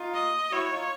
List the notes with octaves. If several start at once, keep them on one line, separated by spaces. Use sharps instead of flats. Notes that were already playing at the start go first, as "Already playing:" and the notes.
Already playing: D#4 F4
D#5
E4 F#4 C#5
D#4 F4